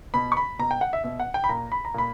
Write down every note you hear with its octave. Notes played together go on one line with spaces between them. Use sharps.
B2 B5
C#6
B5
B2 A#5
G5
F#5
E5
B2 E5
F#5
G5
B5
A#2 A#5
B5
A#5
A#2 B5